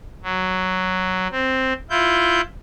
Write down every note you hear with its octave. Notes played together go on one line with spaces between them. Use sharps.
F#3
C4
E4 F4 G6